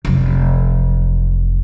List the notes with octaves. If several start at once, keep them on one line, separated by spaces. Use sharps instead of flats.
F1 F#3